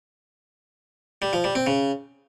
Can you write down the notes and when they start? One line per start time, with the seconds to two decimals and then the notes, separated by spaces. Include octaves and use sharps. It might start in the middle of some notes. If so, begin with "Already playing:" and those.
1.22 G3
1.33 F3
1.44 G3
1.55 C4
1.67 C#3